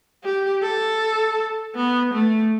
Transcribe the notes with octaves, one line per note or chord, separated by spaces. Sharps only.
G4
A4
B3
A3